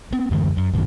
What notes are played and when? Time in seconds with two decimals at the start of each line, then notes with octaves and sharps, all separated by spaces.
0.12 B3 C4
0.31 F#2 D3 E3 G#3
0.57 F#2
0.73 G1 C2 F#2 D#3